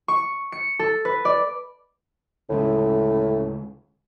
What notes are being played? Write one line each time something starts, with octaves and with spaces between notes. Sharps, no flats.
C#6
C#7
A4
B4
D5
D2 A2 C#3 G#3